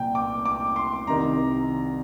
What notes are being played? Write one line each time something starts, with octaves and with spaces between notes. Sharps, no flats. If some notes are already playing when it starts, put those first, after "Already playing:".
Already playing: C2 A#2 G5
D6
D6
C6
C2 C3 D#3 A#5